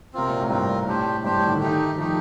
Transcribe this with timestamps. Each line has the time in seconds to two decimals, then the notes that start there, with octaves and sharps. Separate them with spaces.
0.13 C3 C4 F4 A#4
0.29 A#2
0.40 A2
0.50 G2 C4 F4 A#4
0.87 A2 D4 G4 C5
1.24 G2 D4 G4 C5
1.37 A2
1.45 D#3
1.48 D3
1.61 D#3 A3 D#4 G4
1.98 F3 A3 D#4 G4